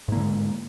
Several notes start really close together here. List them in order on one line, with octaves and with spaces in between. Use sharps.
G#2 A#3 D3 G#3